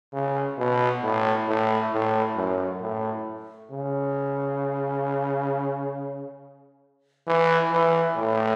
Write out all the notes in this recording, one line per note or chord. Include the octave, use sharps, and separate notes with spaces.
C#3
B2
A2
A2
A2
F#2
A2
C#3
E3
E3
A2